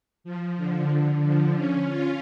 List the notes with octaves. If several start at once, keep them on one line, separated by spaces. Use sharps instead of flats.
F3
D3
D3
F3
C#4
F4